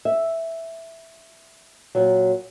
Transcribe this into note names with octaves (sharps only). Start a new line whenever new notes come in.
E5
A#2 F#3